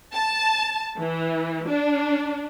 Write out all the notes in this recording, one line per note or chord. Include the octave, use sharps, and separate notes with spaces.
A5
E3
D4